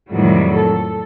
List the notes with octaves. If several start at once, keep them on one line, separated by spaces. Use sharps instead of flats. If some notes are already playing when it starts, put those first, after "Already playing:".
F2 A2 D#3 F#3 G3
A4